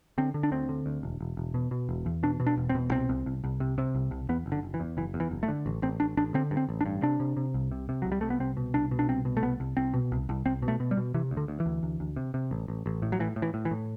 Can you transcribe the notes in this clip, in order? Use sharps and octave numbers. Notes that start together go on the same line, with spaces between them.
D3 C4
D3
D4
D2 C4
D3
D2
E1
E1
E1
B2
B2
E1
E2
B2 D4
B2
D4
E1
C4
B2
C2 C4
C2
C2
C2
C3
C3
C2
C2
E2 B3
F#1
D3
F#1
E3
E2
F#1 E3
E2
E3
F#1
A3
D3
A1
A1 C4
A1 D4
A1 D4
D3 C4
G2
C4
A1
D4
G2
C3 D4
C3
C3
C2
C3
C3
C2 F#3
G3
C3 A3
B3
C2 C4
B2
C2 D4
B2
D4
C2 C4
B2
A3
C2 B3
C2
C2 C4
B2
C2
C2
C2 C4
B2
A3
B2
G3
B2
C3 E3
D2
D3
D2
E3
D2
D2
D2
C3
C3
A1
A1
A1
A2
F#3
A2 E3
A2
E3
A2
E3
A2